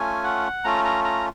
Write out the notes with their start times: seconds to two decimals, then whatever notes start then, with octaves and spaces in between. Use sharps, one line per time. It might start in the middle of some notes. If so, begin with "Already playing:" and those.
Already playing: A3 C#4 F4 G#5
0.24 F#5
0.64 A3 C#4 F4 A#5
0.85 A#5
1.05 A#5